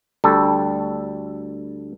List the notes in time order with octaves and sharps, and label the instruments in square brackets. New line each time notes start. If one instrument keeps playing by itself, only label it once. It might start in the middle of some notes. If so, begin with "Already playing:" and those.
[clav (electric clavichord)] D2 G3 A4